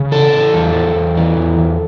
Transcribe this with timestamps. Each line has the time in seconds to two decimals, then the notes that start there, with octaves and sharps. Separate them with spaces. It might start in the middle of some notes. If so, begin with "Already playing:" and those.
Already playing: C#3
0.11 E3 A4
0.33 E3
0.54 E2
0.75 E2
0.95 E2
1.17 E3
1.38 E2
1.58 E2